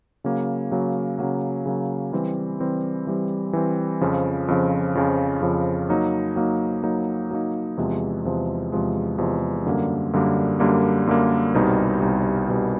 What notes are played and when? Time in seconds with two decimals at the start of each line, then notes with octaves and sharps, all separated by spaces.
0.24 C#3 F#3 A#3
0.71 C#3 F#3 A#3
1.19 C#3 F#3 A#3
1.66 C#3 F#3 A#3
2.13 E3 G3 C4
2.60 E3 G3 C4
3.07 E3 G3 C4
3.53 E3 G3 C4
4.01 F2 C#3 F3
4.48 F2 C#3 F3
4.95 F2 C#3 F3
5.42 F2 C#3 F3
5.89 F#3 A#3 D#4
6.36 F#3 A#3 D#4
6.83 F#3 A#3 D#4
7.31 F#3 A#3 D#4
7.77 E2 C3 F3 G#3
8.25 E2 C3 F3 G#3
8.72 E2 C3 F3 G#3
9.18 E2 C3 F3 G#3
9.66 F#2 D3 G3 A#3
10.13 F#2 D3 G3 A#3
10.60 F#2 D3 G3 A#3
11.07 F#2 D3 G3 A#3
11.54 C2 B2 G3 C4 D#4
12.01 C2 B2 G3 C4 D#4
12.48 C2 B2 G3 C4 D#4